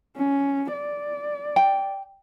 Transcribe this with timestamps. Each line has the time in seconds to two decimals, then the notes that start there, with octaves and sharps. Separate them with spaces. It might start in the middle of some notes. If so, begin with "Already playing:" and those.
0.16 C#4
0.72 D5
1.56 G5